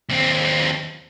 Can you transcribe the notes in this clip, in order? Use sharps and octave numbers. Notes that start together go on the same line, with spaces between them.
D#2 C4